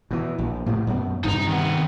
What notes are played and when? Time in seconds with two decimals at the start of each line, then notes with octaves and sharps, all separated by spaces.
0.11 B2 E3
0.38 A#1
0.66 A2 C3 A#3
0.87 F#2 B2
1.24 G2 C3 D#4 A#5
1.47 D#3 B3